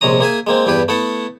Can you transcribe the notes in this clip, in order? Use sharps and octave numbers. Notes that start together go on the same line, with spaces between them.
A#1 C3 G#3 C#4 A#5 D#6
A#3 G#4 E5 G#5
G#3 A#3 C4
E2 G2 E4 G4 B4
A3 B3 E4 F#5 A5